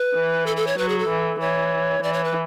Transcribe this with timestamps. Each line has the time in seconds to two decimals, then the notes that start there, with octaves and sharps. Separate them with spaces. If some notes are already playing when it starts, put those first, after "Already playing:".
Already playing: B4
0.15 E3
0.46 A4
0.56 A4
0.67 C#5
0.78 F#3 B4
0.89 G#4
0.99 A4
1.09 E3
1.40 E3 C#5
2.03 E3 D5
2.13 C#5
2.24 B4